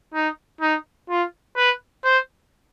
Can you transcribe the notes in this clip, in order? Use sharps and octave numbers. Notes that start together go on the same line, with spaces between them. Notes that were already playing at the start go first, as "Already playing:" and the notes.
D#4
D#4
F4
B4
C5